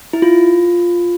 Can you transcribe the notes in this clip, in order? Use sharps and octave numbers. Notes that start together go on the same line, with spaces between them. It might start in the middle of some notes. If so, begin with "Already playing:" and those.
E4
F4